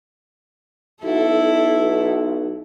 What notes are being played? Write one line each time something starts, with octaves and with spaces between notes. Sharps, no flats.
B1 E4 A4